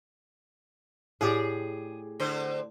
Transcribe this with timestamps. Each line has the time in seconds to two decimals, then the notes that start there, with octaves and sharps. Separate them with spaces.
1.21 A2 G4 G#4 D5
2.20 D3 C4 C5